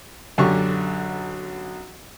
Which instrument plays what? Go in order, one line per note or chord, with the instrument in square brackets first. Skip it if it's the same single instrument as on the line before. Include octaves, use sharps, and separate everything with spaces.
[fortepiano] B1 F#2 D3 C#4 G4 C#6